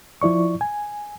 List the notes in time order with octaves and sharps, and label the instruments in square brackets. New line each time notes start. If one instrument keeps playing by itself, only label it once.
[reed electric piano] F3 E4 D5 C#6
G#5